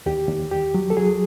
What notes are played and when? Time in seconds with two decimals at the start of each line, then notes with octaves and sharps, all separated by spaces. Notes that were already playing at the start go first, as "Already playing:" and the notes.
0.06 D#2 G4
0.29 D#2
0.51 D#2 G4
0.74 F#3
0.90 A4
0.97 F#3 G#4